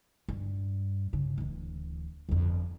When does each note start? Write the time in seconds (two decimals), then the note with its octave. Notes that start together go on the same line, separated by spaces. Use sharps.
0.29 G2
1.13 G2 C#3
1.38 D1 E3
2.29 G1 F2